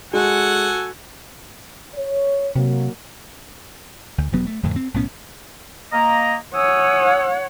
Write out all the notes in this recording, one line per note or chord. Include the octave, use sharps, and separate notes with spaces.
G#3 F#4 A4 F#5 G#5
C#5
C3 F#3 A#3
D2
E1 G2 F#3 B3
A3
F2 A2 D3 D#3
C4
B1 A2 B3 C#4
A#3 D#5 A#5
C#5 F#5 G#5 D#6 E6